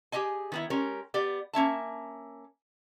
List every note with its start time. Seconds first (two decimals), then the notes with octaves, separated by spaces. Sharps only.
0.12 G4 G#4 D#5 G#5
0.52 D#3 B3 E4
0.70 G#3 C#4 G4 A#4
1.14 B3 G4 D5
1.53 A#3 C#4 E5 A5